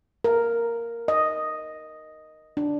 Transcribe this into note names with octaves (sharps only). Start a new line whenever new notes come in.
A#4
D#5
D4